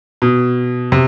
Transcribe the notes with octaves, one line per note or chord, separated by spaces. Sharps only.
B2
C3